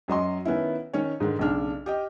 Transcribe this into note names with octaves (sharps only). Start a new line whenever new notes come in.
F#2 F#3 D#5 C6
D#3 B3 C#4 E4
D#3 C#4 C#5
G#2 D3 D#3
B1 C#3 D4 F6
G4 D#5 G5